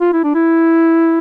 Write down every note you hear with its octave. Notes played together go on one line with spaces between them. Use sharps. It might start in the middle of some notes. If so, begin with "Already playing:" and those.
F4
E4
D4
E4